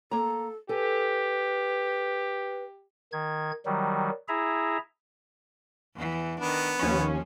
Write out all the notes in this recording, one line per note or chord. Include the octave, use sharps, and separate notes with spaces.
A#3 A4 A#5
G4 A4 B4 G#5
D#3 G#6
D#3 F#3 G3
E4 G#4 E5 A#5
E2 E3
D#3 B3 D4
D#2 F3 C#4